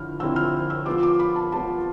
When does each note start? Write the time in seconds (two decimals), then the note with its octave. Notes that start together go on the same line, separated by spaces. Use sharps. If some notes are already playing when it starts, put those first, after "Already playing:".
Already playing: D3 F3 E4 F6
0.19 D3 F3 C4 E4 E6
0.36 F6
0.70 E6
0.86 F3 B3 F4 D6
1.03 D6
1.19 B5
1.36 A5
1.52 F3 B3 F4 A5